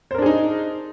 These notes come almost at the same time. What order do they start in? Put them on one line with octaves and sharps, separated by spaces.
C5 A#4 D4 G#4 D#4